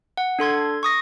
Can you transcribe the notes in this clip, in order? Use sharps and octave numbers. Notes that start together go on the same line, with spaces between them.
F#5
D4 A4 C6 G#6
C#6 D#6 A#6